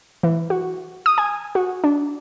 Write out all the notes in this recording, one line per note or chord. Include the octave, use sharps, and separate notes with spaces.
E3
F#4
D#6
G#5
F#4
D4